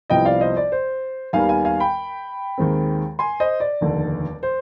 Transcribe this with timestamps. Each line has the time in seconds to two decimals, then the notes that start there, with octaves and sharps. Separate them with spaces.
0.10 C2 C3 F3 B3 D#5 G5
0.25 D5 F5
0.41 C5 D#5
0.57 D5
0.72 C5
1.33 D#2 D#3 G3 B3 F5 G#5
1.49 F5 G#5
1.65 F5 G#5
1.80 G5 B5
2.58 D#2 D#3 G#3 C4
3.19 G#5 C6
3.40 C5 D#5
3.60 D5
3.81 F1 D#2 D3
4.43 C5